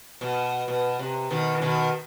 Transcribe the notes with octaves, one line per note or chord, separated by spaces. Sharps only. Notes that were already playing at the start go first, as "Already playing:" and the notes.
B2
B2
C3
B2 D#3
E3
B2 D#3